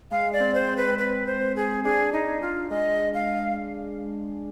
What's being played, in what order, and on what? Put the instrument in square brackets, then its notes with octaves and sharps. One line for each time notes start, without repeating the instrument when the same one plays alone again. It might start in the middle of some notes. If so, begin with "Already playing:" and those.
[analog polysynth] G#3 [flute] F5
[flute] D5
[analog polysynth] C4
[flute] C5
[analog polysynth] C4
[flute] B4
B4
C5
G#4
[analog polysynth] D4 [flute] G#4
[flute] D#4
F4
[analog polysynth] G#3 [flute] D#5
[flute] F5